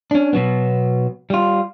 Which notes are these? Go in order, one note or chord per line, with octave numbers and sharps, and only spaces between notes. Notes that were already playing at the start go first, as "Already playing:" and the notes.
C#4 D4
B2 F#3 B3
G3 F4